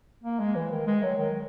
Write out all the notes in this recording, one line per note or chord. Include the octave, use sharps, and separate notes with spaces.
A#3
G#3
E3
D#3
G#3
F#3
D#3